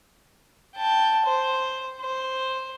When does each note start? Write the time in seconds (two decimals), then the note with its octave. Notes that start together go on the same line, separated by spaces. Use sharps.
0.76 G5 A5
1.26 C5
2.01 C5